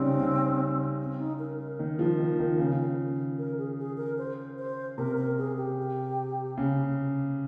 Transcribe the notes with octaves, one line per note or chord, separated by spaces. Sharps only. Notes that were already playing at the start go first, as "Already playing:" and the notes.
Already playing: C#3 G3 C4 C#4 D#4
C#3
C4
D#4
A#4
A#4
D#3
F3
D#3
D#3
C#3
A#4
G#4
G#4
A#4
C5
C5
C3 A#4
A#4
G#4
G4
C#3